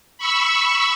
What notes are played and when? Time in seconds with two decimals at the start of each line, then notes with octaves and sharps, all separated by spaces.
0.18 B5 C#6 E6